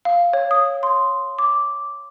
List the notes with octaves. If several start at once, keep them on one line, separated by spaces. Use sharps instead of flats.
F5
C#5
D#6
C6
D6